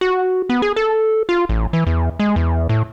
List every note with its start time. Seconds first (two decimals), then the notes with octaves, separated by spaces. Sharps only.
0.01 F#4
0.49 B3
0.62 G#4
0.76 A4
1.29 F4
1.49 A1
1.73 E3
1.87 E2
2.19 G#3
2.36 E2
2.69 A2